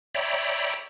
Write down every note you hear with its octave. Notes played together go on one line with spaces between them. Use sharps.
C#5 D5 E5 G5 A#5 B5